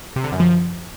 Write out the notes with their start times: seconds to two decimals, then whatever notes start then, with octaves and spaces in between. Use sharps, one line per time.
0.16 C3
0.24 D3
0.32 F#2
0.40 F3